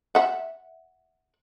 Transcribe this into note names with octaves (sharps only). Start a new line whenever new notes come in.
E5 F#5